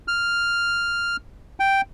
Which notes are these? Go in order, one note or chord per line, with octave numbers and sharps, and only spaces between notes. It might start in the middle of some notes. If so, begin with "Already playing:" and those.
F6
G5